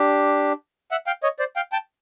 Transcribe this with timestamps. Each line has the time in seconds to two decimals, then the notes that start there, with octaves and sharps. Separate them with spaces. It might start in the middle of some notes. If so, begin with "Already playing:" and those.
Already playing: D4 G4
0.91 E5 F#5
1.07 F5 G5
1.23 C#5 D#5
1.39 C5 D5
1.56 F5 G5
1.72 G5 A5